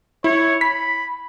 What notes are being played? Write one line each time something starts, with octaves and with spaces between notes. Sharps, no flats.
E4 C#5
B5 B6